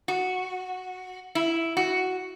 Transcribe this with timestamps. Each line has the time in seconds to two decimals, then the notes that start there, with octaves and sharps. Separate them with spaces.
0.08 F#4
1.35 E4
1.77 F#4